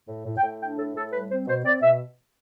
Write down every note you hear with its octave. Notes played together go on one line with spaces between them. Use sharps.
A2
A2
G5
A2
D4 G5
A2 A4
A2 A4
G3 B4
C4 C5
B2 C5
C4 D5
B2 E5